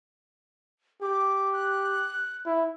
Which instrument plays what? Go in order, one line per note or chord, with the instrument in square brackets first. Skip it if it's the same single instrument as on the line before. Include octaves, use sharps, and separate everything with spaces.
[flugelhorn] G4 [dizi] D6
[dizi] F#6
[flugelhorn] E4